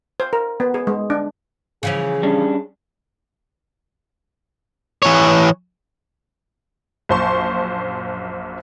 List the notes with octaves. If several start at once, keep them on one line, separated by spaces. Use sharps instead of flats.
C5
A#4
B3
G#4
G#3
D4
C#3 E3 F3 G#4
G3 C#4 D4
E3 C#5
A#1 F#2 C5 A5 C6 C#6